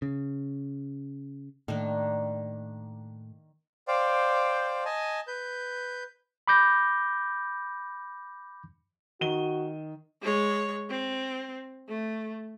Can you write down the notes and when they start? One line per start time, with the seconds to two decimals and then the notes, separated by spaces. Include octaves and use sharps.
0.02 C#3
1.68 A2 D#3 A#3 D4
3.88 C5 D5 F5 G5
4.85 D#5 G#5 A5
5.28 B4 G6
6.48 B5 D6 G6 A#6
9.21 D#3 F#4 D#7 G7
10.22 G#3 C#5
10.90 C4
11.89 A3